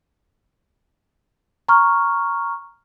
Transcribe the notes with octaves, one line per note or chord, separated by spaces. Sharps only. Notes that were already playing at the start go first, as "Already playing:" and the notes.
A#5 C#6 F6